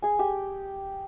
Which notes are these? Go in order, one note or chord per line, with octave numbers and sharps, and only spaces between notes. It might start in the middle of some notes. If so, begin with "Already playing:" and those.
G#4 G#5
G4 G5